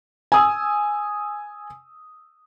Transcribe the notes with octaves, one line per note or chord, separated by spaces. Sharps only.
G#5 D#6 E6